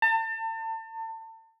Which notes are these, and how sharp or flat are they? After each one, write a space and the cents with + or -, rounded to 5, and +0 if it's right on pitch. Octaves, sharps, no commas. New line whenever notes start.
A5 +35